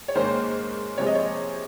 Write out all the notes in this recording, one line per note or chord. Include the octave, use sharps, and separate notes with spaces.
C#5
G#2 D#3 A#3 C#4 C5
C3 F3 G#3 C#5
D#5
C#5